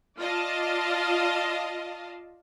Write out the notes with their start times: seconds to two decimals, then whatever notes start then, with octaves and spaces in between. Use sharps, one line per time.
0.19 F4 D5 D#5 F5 A5